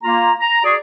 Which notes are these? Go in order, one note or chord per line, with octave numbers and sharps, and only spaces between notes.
A#3 F4 A#5
A#5
F#4 G#4 D5